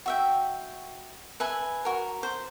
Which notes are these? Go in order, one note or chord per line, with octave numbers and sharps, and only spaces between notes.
F#4 E5 G5
B4 E5 G#5
F#4 A#4
C5